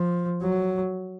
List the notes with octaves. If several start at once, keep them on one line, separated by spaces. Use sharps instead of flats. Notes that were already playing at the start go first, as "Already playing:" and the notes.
Already playing: F3
F#3